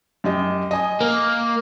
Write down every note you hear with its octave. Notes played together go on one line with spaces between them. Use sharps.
F#2 G4 D#5
D#5 G#5 D#6
A#3